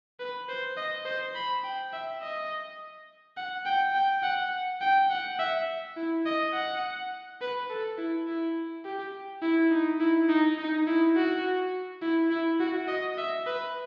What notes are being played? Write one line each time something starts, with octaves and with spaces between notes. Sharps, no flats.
B4
C5
D#5
C5
B5
G5
E5
D#5
F#5
G5
G5
F#5
G5
F#5
E5
E4
D#5
F#5
B4
A4
E4
E4
G4
E4
D#4
E4
D#4
D#4
E4
F#4
E4
E4
F#4
D#5
E5
B4